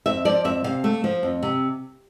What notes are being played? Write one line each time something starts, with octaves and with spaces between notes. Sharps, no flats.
F2 E5
F3 D5
F2 E5
C3 F5
A3
F3
F2
C3